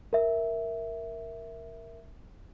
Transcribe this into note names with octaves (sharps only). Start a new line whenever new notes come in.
A#4 E5